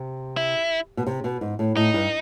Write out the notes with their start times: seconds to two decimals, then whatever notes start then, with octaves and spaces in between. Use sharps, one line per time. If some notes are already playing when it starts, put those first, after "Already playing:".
Already playing: C3
0.37 E4
0.97 B2
1.07 C3
1.24 B2
1.41 G#2
1.59 A2
1.76 A2 D#4
1.94 G2